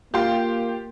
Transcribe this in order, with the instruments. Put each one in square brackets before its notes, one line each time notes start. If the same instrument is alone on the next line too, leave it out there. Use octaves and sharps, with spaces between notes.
[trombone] A#3 [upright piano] F4 [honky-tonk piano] G4 G5 C6